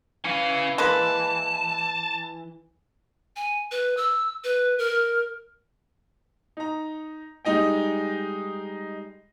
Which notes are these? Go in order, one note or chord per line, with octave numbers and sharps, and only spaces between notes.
E3 C#4 F5
G#3 A#3 B4 A5
G#5
B4
E6
B4
A#4
D#4 A#5
G3 G#3 D#4 D#5 G5